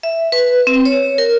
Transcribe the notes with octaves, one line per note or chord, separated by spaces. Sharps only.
E5
B4
C4
C#5
A#4